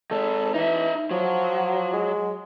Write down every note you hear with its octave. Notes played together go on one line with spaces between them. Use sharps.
D#3 G#3 A4
E3 D#4 E5
F3 F#3
G#3